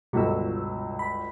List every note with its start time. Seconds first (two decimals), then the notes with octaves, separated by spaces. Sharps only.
0.13 G1 C#2 B2 F#3 E6
0.99 B5